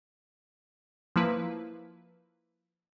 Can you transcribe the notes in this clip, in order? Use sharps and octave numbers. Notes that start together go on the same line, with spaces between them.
F3 A#3 E4 B4